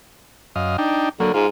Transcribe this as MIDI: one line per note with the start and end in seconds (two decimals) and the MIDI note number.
0.56 0.77 42
0.56 0.77 75
0.56 0.77 77
0.78 1.09 62
0.78 1.09 63
0.78 1.09 79
1.20 1.31 50
1.20 1.32 54
1.20 1.32 58
1.34 1.47 44
1.34 1.47 65